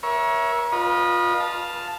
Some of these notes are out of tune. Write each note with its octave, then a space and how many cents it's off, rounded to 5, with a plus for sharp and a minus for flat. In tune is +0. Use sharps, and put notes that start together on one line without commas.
A#4 +40 C#5 +0 E5 +0
F4 +15 B4 -35 D#5 -20
F5 +0 A5 +0